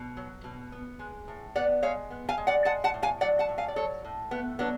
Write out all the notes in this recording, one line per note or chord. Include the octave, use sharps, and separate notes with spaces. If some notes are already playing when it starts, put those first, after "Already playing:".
Already playing: B2
F#3
B2
B3
G#3
A2
B3 D5 F#5
G#3 C#5 F5
B3
F5 G#5
G#3
D5 F#5
G#3 F#5 A5
F#5 A5
A2
F5 G#5
F#3 D5 F#5
F#5 A5
A2
F5 G#5
D5
F#3 A4 C#5
A2
A3 B3
F#3 B3 D4